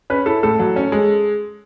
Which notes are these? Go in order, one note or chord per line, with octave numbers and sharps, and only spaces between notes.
C#4 B4
E4 A4
A2 A4
F#3
C#4
G#3